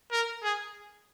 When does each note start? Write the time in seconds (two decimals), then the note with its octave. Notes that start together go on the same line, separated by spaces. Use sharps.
0.12 A#4
0.43 G#4